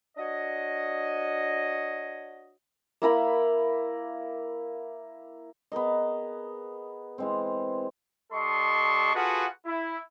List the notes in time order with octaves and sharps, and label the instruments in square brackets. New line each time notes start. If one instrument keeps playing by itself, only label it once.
[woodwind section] D4 F#4 C#5 D#5
[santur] A#3 E4 A#4 B5
[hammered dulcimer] B3 G#4 A#4 D#5
E3 G#3 C4
[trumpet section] G3 D4 A4 D#5 C6 C#6
F4 F#4 G#4 A4 B4 F#5
E4